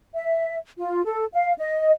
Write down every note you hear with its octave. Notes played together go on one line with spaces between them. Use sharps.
E5
F4
A4
F5
D#5